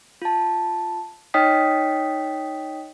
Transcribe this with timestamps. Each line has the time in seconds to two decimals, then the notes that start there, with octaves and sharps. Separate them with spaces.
0.22 F4 A5
1.34 D#4 C#5 D#5 G5 D#6 B6